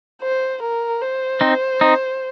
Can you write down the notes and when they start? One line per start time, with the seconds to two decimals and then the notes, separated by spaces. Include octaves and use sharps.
0.22 C5
0.62 A#4
1.01 C5
1.41 C4 D#4
1.81 C4 D#4